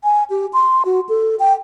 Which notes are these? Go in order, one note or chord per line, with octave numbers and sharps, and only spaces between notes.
G#5
G4
C6
F#4
A4
G5